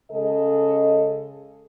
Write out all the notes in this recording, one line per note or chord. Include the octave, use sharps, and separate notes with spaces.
C#3 G#3 G#4 A4 D#5